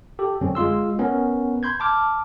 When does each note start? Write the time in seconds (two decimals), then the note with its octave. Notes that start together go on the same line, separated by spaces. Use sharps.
0.19 G4 A4
0.41 F#2 D3 C4 C#4
0.55 G#3 F4 C6 E6
0.99 B3 C#4 A#4 B4
1.63 B5 C6 G6 G#6
1.80 A5 D6 F6